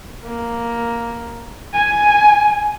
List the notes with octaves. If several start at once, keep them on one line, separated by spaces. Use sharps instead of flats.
A#3
G#5